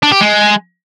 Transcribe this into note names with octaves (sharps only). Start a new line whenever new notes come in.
D4
G4
G#3